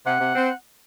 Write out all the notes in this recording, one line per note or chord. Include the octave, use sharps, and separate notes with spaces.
C3 F#5
C3
C4